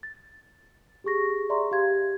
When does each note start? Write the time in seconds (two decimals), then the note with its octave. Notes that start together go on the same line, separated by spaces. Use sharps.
0.03 A6
1.04 G4 G#4 C#6 A#6
1.49 G#4 D5 E5 A#5 C6 C#6
1.71 G4 F5 G#6